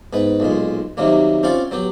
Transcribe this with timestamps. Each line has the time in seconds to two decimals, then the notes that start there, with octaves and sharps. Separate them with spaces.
0.13 G#2 B3 B4
0.40 B1 A#2 G#3
0.97 C3 D#3 F#3 G3 A#3
1.43 C4 C#4 F4 D5 F#5
1.71 F#3 B3 G4